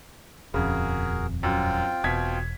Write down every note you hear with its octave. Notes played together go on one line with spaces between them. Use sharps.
D#1 F2 C#3 F#4 G#4 A#4
F#2 C4 F4 G5
E1 B2 G#6 B6